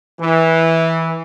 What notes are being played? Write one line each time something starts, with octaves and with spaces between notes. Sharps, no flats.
E3